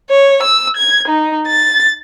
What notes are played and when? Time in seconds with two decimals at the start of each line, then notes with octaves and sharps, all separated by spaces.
0.10 C#5
0.43 E6
0.77 G#6
1.08 D#4
1.48 A6